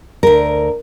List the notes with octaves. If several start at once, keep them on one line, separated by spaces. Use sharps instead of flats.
D2 A#4